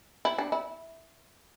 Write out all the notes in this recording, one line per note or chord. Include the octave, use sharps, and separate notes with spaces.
E4
D4
E4